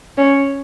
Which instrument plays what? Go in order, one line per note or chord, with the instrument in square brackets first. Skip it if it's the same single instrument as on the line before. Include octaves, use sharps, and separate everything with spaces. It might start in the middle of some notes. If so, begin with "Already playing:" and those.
[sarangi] C#4